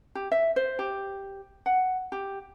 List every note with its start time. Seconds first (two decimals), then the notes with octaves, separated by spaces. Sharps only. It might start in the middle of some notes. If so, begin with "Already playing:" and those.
0.15 G4
0.32 E5
0.56 C5
0.79 G4
1.66 F#5
2.12 G4